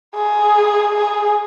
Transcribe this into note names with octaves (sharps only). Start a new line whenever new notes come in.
G#4
G#4